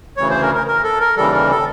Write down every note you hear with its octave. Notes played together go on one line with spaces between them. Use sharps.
D2 C#3 E3 C#5
C5
A#4
A#4
A#4
A4
A#4
D#2 C#3 E3 G3 A4
A#4
A4